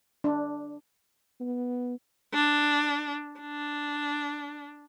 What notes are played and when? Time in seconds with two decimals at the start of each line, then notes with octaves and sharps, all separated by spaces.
0.24 D4
1.40 B3
2.34 D4
3.40 D4